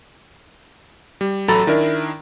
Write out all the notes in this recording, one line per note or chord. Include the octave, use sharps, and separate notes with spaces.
G3
A1 F#3 A4 A#5 B5 A6
D#3 D4 E4 A#4